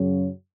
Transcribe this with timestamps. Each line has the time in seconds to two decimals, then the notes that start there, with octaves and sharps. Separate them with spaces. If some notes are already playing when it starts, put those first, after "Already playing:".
Already playing: F#2 C#3 F#3